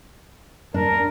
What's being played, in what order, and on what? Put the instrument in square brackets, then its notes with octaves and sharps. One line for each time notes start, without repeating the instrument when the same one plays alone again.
[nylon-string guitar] D4 [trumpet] A#4